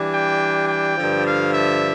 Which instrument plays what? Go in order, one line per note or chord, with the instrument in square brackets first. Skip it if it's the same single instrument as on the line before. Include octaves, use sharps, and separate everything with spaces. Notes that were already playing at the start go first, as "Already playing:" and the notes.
Already playing: [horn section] E3 G3 D4
G5
G5
G2 D3 F3
F5
E5